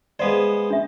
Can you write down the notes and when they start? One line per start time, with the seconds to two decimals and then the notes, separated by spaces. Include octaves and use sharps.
0.19 G#3 B3 C5 D5 F5
0.70 D4 E5